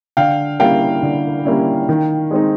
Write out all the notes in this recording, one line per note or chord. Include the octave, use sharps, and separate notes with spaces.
D3 F5 G5
G3 A#3 C#4 E4 F5 G5
D3
G3 A#3 C#4 E4
D#3
G#3 C4 D#4